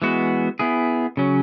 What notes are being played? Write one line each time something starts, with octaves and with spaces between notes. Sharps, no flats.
E3 G#3 B3 F#4
B3 E4 G#4
C#3 F#3 C#4